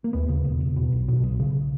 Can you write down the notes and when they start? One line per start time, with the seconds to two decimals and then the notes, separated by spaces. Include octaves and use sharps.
0.04 A#3
0.13 D#2 B3
0.29 C#3
0.45 E1
0.61 E1
0.76 B2
0.92 B1
1.08 B2
1.23 B1
1.40 C#3